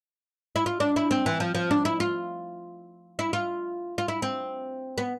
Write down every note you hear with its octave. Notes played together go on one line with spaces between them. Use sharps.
E4
F4
D4
E4
C4
E3
F3
F3
D4
E4
F4
E4
F4
F4
E4
C4
B3